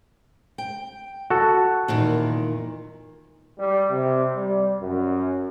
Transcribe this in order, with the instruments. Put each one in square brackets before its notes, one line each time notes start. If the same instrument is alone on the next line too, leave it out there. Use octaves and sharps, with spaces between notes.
[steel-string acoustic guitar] G5
[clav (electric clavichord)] F#4 A4
[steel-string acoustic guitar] E2 A#2 D#3
[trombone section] G3
C3
G3
F#2